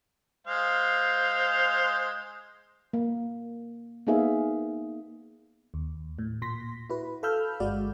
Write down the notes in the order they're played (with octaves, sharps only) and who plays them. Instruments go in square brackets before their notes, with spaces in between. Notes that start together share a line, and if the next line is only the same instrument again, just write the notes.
[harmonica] G#3 C5 F5
[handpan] A#3
A#3 B3 D#4 G#4 E5 F5
[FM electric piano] D#2
A2
A#2 C6 A#6 B6
E4 F#4 B4
A4 F5 B5 E6 F6 G6
G1 G#3 F#4 D5